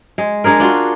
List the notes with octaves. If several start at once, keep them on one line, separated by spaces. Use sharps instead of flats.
G#3
G#3 D4 G#4 A#4
D4 F4 F#4